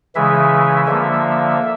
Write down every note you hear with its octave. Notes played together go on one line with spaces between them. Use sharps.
C#3 E3 G#3 E5
D3 F3 A#3 E5